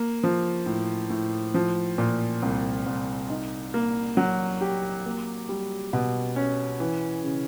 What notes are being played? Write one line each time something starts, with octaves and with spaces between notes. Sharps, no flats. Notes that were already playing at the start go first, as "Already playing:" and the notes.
Already playing: A#3
F3
A2
A2
F3
A#2
C2
C2
D#4
A#3
F#3
G4
A#3
G3
B2
C#4
E3
C#3